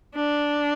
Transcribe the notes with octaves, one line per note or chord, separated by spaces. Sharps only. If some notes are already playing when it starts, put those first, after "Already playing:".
D4